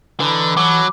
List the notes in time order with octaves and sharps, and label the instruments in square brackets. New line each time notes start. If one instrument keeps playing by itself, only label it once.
[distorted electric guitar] D3 [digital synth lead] E3 [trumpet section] D#4 B4
[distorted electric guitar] F#3 [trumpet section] A4 B5 [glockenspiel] D6